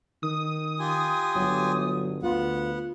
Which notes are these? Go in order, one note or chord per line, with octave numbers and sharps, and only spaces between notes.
D#3 D#6
F4 G4 G#5
G1 F#3
D2 B3 F4 F#5